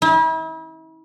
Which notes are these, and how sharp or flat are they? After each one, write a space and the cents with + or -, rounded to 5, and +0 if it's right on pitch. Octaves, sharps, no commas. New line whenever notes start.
E4 -40